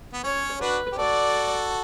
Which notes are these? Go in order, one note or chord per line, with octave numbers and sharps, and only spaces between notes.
B3
C#4 C#5
D4 F#4 B4
G4
F#4 A4 D5